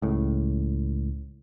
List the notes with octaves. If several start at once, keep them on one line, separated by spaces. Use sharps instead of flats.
C#2 A2